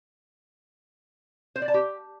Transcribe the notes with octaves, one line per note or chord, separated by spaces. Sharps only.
C5
D5
A5
G4